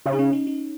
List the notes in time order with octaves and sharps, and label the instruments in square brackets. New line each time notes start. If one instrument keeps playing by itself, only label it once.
[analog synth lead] C#3
[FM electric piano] D#4
C#4
D#4
D#4